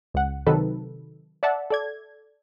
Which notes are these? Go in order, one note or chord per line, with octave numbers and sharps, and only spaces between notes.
C#2 F#5
C3 D#3 F#3 D#4 A4 B4
D5 E5 F#5 A5
A4 D5 G#6